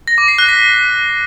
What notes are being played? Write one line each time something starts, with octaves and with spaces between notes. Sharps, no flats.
A#6
D6
C7
F#6
B6